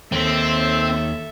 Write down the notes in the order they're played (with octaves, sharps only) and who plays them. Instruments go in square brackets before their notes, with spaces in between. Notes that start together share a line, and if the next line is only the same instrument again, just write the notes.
[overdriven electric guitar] D#2 [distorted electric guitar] C4 [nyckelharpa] A4 E5